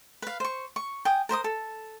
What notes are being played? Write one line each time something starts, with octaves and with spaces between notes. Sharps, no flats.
B4 F5
C5 C#6
C#6
G5 G#5 D#6
A#4 C5 B5 D#6
A4